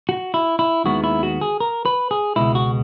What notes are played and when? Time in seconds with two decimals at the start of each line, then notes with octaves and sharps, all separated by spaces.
0.09 F#4
0.34 E4
0.59 E4
0.84 D#2 D#3 G#3 B3 E4 F#4
1.04 E4
1.23 F#4
1.41 G#4
1.60 A#4
1.86 B4
2.11 G#4
2.36 C#2 B2 G#3 B3 E4
2.55 F#4